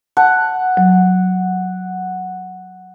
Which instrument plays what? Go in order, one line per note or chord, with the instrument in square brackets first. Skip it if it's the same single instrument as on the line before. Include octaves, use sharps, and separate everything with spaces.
[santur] F#5 [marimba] A5
[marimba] F#3